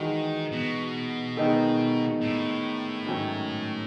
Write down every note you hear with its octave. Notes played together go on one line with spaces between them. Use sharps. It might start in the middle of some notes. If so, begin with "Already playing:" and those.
Already playing: D#3 E3 G#3 D#4 F#4
B2
D#3 G#3 B3 D#4 A4
A2
G#2 D#3 F#3 A3 C#4